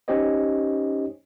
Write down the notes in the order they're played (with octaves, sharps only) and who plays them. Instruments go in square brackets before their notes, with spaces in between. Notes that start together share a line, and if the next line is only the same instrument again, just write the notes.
[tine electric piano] C#4 D#4 G4 C5 C#5 D#5